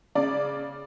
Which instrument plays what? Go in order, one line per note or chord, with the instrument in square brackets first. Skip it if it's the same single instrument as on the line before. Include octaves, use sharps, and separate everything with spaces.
[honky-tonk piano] C#3 D5